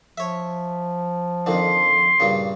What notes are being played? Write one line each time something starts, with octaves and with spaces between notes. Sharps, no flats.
F3 C#5 E5
F2 D3 D#3 C6
G2 A#2 C#3